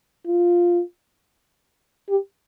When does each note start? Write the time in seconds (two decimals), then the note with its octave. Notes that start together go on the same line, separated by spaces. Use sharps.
0.27 F4
2.09 G4